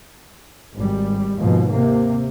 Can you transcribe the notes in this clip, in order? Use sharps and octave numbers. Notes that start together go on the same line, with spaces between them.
G#1 G3
D#2 G#2 B2 F3
C3 A#3